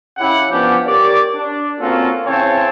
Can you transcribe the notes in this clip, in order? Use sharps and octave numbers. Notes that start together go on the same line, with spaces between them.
C#3 C#4 E4 G4 F#5
F3 B3 C#4 D4 G4
G4 A#4 C#5 D5
D4
A#3 C4 C#4 F4 F#4 A4
C#3 E3 C4 C#5 A5